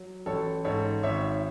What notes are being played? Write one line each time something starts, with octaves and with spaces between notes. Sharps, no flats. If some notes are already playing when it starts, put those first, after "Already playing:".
Already playing: F#3
A1 A4 C#5
G#2 A4 C#5
G#1 C#5 E5